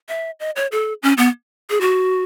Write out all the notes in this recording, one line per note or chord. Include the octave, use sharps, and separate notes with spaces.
E5
D#5
C#5
A4
C#4
B3
G#4
F#4